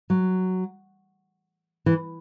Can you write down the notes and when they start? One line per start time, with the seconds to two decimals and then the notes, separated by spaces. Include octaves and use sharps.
0.10 F#3
1.86 E3